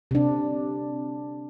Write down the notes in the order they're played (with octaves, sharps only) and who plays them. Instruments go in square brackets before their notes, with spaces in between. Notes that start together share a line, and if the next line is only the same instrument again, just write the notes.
[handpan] C3 D4